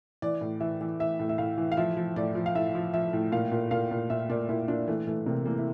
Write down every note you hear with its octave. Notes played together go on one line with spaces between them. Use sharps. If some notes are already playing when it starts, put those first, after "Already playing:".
E3 D5
A2
E3 E5
E3
E3 E5
A2
E5
A2 F5
E3
F5
F3 E5
F3
A2 D5
F3
F5
A2 E5
F3
F3 E5
A2
A#2 F5
A#2
A#2 F5
A#2
A#2 E5
A#2 D5
A#2 E4
A#2 D4
E3 A3
E3 A3
C3 A#3
E3 A#3
E4